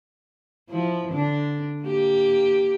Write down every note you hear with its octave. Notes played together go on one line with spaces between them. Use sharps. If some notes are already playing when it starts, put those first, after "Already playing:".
F3 E4
D3 D4
A#3 G4